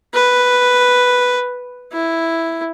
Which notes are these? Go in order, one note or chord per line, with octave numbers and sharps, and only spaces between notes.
B4
E4